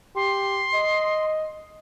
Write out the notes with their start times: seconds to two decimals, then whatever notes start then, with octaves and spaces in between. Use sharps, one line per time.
0.16 G4 C6
0.74 D#5